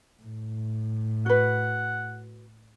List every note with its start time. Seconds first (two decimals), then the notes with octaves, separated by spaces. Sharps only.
0.23 A2
1.26 F#4 B4 F#5